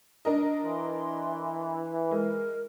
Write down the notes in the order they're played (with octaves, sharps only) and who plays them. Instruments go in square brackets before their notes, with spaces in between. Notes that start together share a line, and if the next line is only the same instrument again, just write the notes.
[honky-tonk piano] D4 A#4 D#5
[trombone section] E3 [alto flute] C6
[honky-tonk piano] G#3 [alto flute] A#4